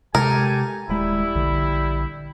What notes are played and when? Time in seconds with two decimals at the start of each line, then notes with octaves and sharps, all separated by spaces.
0.15 C3 G#3 G4 A4 A#4 G#5
0.89 D#1 G3 G#3 E4
1.35 A#1 D3